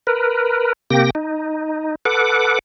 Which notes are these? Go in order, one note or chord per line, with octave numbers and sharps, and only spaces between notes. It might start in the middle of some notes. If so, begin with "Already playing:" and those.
A#4 B4
C3 A#3 G4 G5 A#6
D#4
A4 B4 F#5 D6